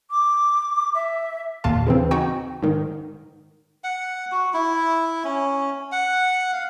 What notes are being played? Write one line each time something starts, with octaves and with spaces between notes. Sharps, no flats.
D6
E5
D#2 A#2 F4 F5 A5
C#3 E3 C4
D#4 F#4 G5
G#2 D#3
F#5
F#4
E4
C#4
F#5
F5